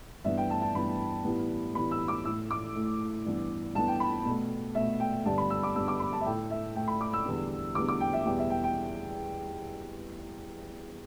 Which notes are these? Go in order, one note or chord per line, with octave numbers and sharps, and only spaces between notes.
G2 E3 B3 E5
G5
A5
A5
G2 E3 B3 B5
A2 E3 G3 B3
A2 E3 G3 B3 B5
E6
D6
A2 A3 E6
D6
A2 A3
G2 E3 B3
G2 E3 B3 A5
G5
B5
B2 A3
B2 A3 E5
G5
G2 D3 G3 B3 A5
B5
E6
D6
G2 D3 G3 B3 E6
D6
B5
A5
E5
A2 A3 G5
E5
A2 A3 G5
B5
D6
E6
E2 D3 G3 B3
E2 D3 G3 B3 D6
D6
G5
E5
E2 B2 G3 B3 G5
E5
G5
G5